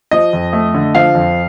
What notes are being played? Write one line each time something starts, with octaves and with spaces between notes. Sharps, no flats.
F3 D#5
F2
A3
D3
F3 F5
F2